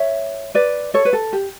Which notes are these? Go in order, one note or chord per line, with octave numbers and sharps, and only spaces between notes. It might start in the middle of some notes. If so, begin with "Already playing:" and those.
Already playing: C#5 E5
B4 D5
A4 C#5
B4
A4
G4